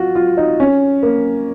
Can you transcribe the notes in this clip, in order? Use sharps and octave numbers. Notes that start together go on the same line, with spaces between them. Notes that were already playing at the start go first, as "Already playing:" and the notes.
Already playing: F4 F#4
F4
D#4
C#4
A#3